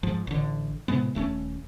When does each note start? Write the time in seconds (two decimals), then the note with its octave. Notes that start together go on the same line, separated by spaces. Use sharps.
0.03 G#2 F3
0.27 A1 D3
0.88 A2 C3 G#3 B3
1.15 D#1 A3 C4 C#4